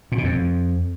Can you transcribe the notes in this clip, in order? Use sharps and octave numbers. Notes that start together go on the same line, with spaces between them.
A#2
B2
F2